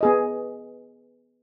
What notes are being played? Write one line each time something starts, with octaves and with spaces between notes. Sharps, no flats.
B3 G#4 D#5